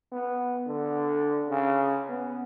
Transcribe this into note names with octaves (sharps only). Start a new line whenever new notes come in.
B3
D3
C#3
B3